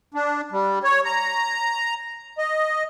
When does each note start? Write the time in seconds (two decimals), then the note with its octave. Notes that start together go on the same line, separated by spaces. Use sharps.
0.14 D4
0.52 G3
0.84 C#5
1.05 A#5
2.38 D#5